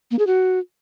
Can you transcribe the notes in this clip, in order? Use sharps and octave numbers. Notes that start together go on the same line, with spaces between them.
A#3
G#4
F#4